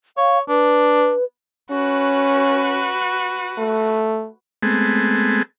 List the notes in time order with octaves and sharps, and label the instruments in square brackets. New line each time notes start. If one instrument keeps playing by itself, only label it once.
[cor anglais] C#5 [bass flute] F5
[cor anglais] D4 [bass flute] B4
[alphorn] C#4 [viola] F#4 B4
[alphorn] A3
[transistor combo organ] G#3 A3 B3 C4 G#4 A4